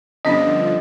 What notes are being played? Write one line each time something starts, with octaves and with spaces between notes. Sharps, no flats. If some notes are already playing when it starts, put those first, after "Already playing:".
G2 D3 F3 B3 C#4 D4 D#5